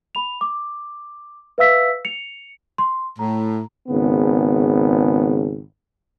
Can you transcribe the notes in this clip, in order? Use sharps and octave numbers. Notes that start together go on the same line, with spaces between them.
B5 F7
D6
B4 E5 F5 E6 B6
C#7 F7
C6
A2 A#5
G#1 C#3 B3